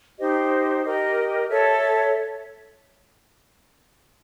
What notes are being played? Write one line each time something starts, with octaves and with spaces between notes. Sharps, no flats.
D#4 G4 C5 D#5
G4 A#4 D#5
A4 C#5 E5